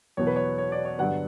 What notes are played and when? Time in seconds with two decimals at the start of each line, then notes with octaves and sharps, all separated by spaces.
0.17 E2 B2 F#3 C#5
0.27 B4
0.36 C#5
0.58 C#5
0.72 D5
0.85 C#5
0.98 G2 D3 F#3 B3 F#5